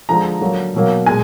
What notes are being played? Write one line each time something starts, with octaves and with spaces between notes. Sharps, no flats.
D3 F3 G#3 A#5
D3 F#3 A#3
B2 F#3 A#3
A#2 G#3 G#5